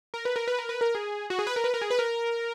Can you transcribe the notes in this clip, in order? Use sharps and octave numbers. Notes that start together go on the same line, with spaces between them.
A#4
B4
A#4
B4
A#4
B4
A#4
G#4
F#4
G#4
B4
A#4
B4
A#4
G#4
B4
A#4